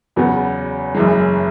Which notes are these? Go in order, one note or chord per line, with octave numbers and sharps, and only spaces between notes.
E2 C#3 F#3 B3
F#1 F#2 E3 G#3